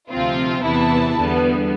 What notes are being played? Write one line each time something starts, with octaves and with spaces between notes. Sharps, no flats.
D2 C3 F3 C4 F4
E2 C3 E3 B3 E4 A5
E2 D3 G3 B3